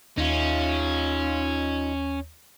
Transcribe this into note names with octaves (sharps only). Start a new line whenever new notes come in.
D#2 C#4 D#4 F4